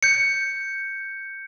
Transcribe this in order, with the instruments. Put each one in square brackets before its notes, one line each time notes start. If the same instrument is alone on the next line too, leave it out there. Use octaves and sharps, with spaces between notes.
[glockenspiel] G6 C#7